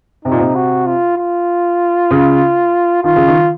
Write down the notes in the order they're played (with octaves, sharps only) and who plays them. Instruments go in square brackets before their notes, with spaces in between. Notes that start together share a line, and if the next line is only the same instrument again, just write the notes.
[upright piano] C3 [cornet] D#4
[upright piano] A#2
C3
[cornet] F#4
F4
F4
[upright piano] C#3
[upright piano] D#3 [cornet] F4
[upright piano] C#3
D#3